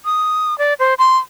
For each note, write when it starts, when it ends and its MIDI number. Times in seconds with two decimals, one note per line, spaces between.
0.05 0.57 87
0.58 0.74 74
0.79 0.94 72
0.99 1.17 84